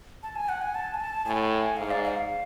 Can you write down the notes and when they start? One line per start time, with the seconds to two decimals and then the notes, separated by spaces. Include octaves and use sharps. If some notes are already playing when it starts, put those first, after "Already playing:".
0.23 A5
0.36 G#5
0.49 F#5
0.62 G#5
0.75 A5
0.94 G#5
1.00 A5
1.26 A2 G#5
1.77 G#2 F5
1.91 D5
2.04 F5